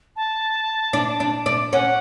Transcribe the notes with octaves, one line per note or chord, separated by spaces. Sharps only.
A5
D4
D4
D4
C#4 F#5